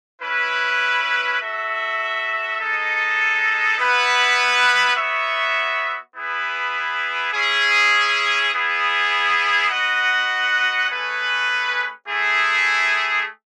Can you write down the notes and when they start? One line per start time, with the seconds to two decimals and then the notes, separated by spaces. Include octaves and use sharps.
0.21 C#4 E4 B4
1.40 F#4 A4 E5
2.58 G#3 D#4 A4 D#5
3.77 B3 E4 B4 F#5
4.95 B3 F#4 C#5 E5
6.14 B3 E4 G#4 B4
7.33 C#4 E4 G#4
8.51 B3 E4 G#4
9.69 F#4 B4 D#5 F#5
10.88 A3 C#4 G#4 B4
12.07 A3 E4 G#4